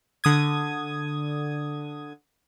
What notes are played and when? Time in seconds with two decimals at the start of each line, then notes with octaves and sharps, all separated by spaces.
0.24 D3 D#6 G#6